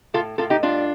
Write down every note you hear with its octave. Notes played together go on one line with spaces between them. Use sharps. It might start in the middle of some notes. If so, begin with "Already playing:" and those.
A2 F4 A4
A2 F4 A4
D#4 G4
G3 D4 F4